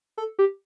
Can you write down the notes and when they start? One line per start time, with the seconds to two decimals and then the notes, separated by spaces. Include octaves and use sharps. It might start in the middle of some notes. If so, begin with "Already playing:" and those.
0.18 A4
0.39 G4